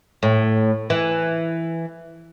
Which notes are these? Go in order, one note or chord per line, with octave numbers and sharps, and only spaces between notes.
A2
E3